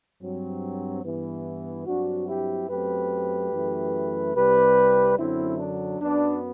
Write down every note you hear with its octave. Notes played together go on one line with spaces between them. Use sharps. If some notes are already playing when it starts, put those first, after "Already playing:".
G2 F#3 C4
G2 E3 B3
G2 F#3 C4 D4 F#4
E4 G4
F#2 F#3 A3 C4 G4 B4
F#2 E3 A3
C2 C3 G3 G4 B4
F#2 D3 F#3 C4 E4
D4
F#2 F#3 B3 D4